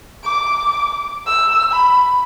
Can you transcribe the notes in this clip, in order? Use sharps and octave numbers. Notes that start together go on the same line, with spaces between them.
D6
E6
B5